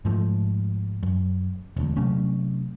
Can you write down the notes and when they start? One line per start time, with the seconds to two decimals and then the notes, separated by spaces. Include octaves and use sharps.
0.05 G#2 F3 A3
1.03 F#2
1.77 E1 D2
1.97 C3 F#3 A3 C#4